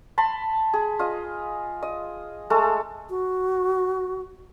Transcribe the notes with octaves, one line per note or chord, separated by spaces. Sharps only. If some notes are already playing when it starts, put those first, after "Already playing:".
A5 B5 C6
G#4
F4 D#5
D#5
G#3 A3 A4
F#4